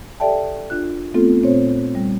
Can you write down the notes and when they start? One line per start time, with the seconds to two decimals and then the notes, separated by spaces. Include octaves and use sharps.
0.20 G4 A4 D5 E5 G5 A5
0.70 D4 F4 F#6
1.14 A3 B3 C4 F4 A4
1.43 A#2 C4 C5 C#5
1.95 G3